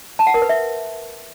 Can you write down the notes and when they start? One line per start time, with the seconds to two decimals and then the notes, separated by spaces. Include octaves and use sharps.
0.19 A5
0.27 F#5
0.34 A#4
0.42 B4
0.49 E5